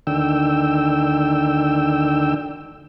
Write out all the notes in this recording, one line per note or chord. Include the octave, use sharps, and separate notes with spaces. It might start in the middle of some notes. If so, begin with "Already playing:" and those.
D2 D3 D#3 G5 E6